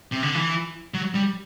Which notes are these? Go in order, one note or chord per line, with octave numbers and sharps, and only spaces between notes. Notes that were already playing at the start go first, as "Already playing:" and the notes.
C3
D3
E3
F#3
G3